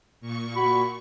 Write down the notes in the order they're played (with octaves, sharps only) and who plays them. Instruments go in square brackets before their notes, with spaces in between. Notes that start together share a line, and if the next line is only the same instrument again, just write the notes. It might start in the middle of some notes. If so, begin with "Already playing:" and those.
[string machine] A#2 C#6
[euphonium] F#4 [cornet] B5